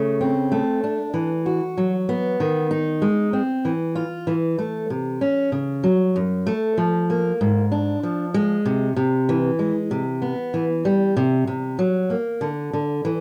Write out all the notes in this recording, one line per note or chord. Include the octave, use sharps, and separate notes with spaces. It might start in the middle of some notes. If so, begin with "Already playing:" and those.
Already playing: C#3 A3
C4
A3
D4
E3
F#4
F#3
B3
D#3
D#4
G#3
C4
E3
F4
E3
A3
C3
C#4
C#3
F#3
F#2
A3
F3
A#3
G#2
D4
F3
G#3
C3
C3
E3
G#3
C3
B3
E3
G3
C3
C3
F#3
A#3
D3
D3
E3